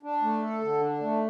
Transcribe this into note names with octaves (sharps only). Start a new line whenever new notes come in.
D4
A3
A4
D3
D4
A3